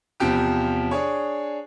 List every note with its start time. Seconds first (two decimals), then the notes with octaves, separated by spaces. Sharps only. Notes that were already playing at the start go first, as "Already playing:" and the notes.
0.20 E2 C3 F3 G4 D7
0.91 D4 G#4 C#5